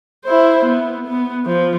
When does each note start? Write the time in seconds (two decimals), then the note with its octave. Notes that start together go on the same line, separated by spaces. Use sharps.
0.25 E4 C5
0.65 B3
1.07 B3
1.46 F3